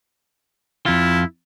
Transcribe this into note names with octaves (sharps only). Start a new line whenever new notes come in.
F2 E4 F4